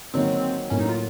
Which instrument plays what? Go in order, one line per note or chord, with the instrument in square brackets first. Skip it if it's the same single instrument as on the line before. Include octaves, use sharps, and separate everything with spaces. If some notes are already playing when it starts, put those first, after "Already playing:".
[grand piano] D#3 F#3 A#3 [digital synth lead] C4
[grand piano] A2 F#3 A#3 [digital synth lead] C#4
[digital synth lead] D#4
F4